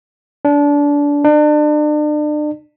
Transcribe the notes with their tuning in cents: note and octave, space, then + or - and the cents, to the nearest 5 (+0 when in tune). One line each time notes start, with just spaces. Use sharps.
D4 -25
D4 +35